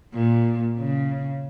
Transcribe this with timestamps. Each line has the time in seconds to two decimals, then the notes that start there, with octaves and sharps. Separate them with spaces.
0.14 A#2
0.78 C#3